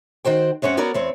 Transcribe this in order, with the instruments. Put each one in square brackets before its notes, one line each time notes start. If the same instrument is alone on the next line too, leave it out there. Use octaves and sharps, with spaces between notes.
[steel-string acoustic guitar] D#3 F#4 C5 G5
F#2 C4 C#4 C#5 F#5
B3 F#4 A#4 C#5 D5
E2 C4 C#5